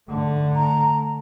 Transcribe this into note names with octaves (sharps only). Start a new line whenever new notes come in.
D3 A3
A#5